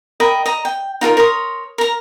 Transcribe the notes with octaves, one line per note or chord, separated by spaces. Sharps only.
A#4 D#5 G5 B5
D#5 A#5
G5
D#4 F4 A4 A#4
A#4 C#5 C6 D#6
A#4 A#5